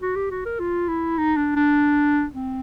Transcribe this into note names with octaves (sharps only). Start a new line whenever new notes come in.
F#4
G4
F#4
A#4
F4
E4
D#4
D4
D4
C4